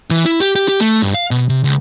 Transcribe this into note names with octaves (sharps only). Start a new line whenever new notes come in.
E3
E4
G4
G4
G4
A3
G2
F5
B2
C3
C#2